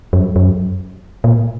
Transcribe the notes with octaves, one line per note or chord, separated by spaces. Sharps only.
F#2
F#2
A#2